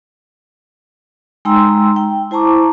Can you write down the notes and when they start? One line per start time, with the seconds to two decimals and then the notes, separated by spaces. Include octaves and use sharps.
1.45 G#3 D#4 G5 A#5 C6 E6
1.96 G5
2.31 E4 C5 A5 A#5 C#6 D6